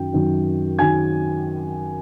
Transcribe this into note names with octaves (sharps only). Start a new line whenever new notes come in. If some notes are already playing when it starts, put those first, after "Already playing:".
Already playing: F#2 D#3 F#3 G5
F#2 D#3 F#3
D#3 F#3 G#5 G#6